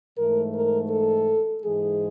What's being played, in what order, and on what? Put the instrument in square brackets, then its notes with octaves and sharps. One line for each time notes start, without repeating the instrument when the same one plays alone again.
[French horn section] G#2 E3 A3 A#4
A#4
A4
G#2 E3 G#3 G#4